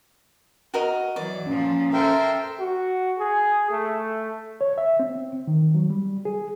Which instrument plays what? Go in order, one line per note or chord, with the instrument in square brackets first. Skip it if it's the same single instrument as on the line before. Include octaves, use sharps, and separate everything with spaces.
[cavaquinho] F#4 A#4 D#5
[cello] E3 F#3 [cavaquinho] D5
[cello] A#2 F3 [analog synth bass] C#4
[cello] A4 C5 [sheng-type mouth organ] A#4 E5 G5
[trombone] F#4
G#4
A3
[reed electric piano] C#5
E5
C4
D#3
F#3
G3
G#4